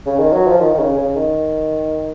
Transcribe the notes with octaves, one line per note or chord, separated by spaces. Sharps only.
C#3
D#3
F#3
F3
D#3
D#3
C#3
C#3
D#3